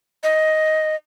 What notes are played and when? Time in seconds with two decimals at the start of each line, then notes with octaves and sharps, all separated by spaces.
0.23 D#5